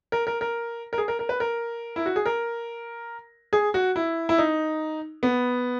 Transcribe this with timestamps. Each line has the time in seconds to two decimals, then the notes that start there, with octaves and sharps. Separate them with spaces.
0.12 A#4
0.27 A#4
0.41 A#4
0.93 A#4
0.98 G#4
1.08 A#4
1.19 A#4
1.29 B4
1.40 A#4
1.96 E4
2.06 F#4
2.16 G#4
2.26 A#4
3.53 G#4
3.74 F#4
3.96 E4
4.29 E4
4.38 D#4
5.23 B3